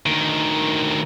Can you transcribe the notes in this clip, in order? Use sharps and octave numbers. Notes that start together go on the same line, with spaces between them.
D2 D#3